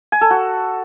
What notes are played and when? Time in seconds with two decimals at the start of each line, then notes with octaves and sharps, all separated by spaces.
0.12 G#5
0.21 A4
0.30 F#4